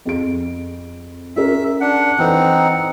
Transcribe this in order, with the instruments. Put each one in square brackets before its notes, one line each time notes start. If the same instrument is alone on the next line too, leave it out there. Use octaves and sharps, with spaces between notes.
[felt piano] F2 G#4 D7
[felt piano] C#4 G#4 A#4 [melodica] E5
[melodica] D4 [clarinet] F#5
[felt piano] E3 A4 B4 [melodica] C4 D#4